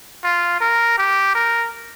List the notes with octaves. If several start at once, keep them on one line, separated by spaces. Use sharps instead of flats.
F4
A#4
G4
A#4